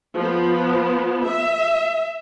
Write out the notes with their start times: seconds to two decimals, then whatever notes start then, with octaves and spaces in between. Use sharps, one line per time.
0.18 F3 B3
1.25 E5